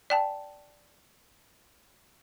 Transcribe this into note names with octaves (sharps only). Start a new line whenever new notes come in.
D5 G5 A5